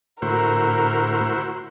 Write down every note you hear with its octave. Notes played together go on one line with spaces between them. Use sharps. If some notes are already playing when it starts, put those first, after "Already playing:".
A2 D3 A3 E4 F#4 A#4 C5